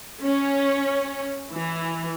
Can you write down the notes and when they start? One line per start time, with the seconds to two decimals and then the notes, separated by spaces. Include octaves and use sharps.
0.24 C#4
1.54 E3